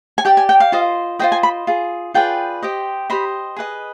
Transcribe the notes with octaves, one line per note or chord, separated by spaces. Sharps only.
G#5
G4 D5 G5
G#5
G5
F5
F4 C5 D#5
F4 C5 D#5 G5
G#5
B5
F4 G#4
F4 G#4 B4 D5 G5
G4 C5 D#5
G4 C5 D#5 B5
G#4 B4 D#5